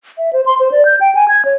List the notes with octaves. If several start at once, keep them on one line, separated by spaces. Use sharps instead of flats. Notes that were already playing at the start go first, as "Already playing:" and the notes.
E5
C5
C6
C5
D5
G6
G5
G#5
G#6
C#5